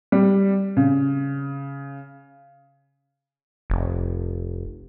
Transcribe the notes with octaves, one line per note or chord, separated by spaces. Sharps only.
G3
C#3
F1